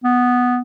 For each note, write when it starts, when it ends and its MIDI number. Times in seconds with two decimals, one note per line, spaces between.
0.04 0.60 59